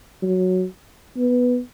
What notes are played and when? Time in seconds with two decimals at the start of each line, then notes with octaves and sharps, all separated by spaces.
0.22 F#3
1.17 B3